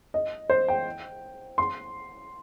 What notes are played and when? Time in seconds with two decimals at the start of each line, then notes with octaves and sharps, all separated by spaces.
0.14 D#5
0.50 C5
0.68 G5
1.58 C6